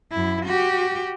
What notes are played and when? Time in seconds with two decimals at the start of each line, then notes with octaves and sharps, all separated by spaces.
0.12 F#2 E4
0.45 F#4 G4